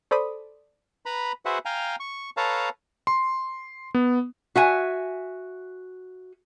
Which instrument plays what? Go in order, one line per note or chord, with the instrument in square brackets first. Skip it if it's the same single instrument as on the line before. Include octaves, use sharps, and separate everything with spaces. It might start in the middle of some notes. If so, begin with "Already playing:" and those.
[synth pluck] A4 C5 D5 B5 D#6
[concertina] B4 A#5 B5
F#4 G#4 B4 C5 E5 F#5
F5 G5 G#5 A#5
C#6
A4 B4 C#5 F5 A5 A#5
[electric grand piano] C6
B3
[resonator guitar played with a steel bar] F#4 E5 G#5